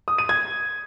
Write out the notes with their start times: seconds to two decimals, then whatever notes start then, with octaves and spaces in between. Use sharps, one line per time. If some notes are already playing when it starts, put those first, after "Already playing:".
0.08 D#6
0.18 D#7
0.29 G#6